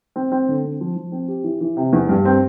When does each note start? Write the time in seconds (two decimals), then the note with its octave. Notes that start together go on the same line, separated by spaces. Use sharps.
0.16 C4
0.32 C4
0.48 D3
0.64 C4
0.81 F3
0.96 F3
1.12 C4
1.28 G4
1.44 E3
1.61 E3
1.77 C3
1.93 E2
2.09 G2
2.25 C4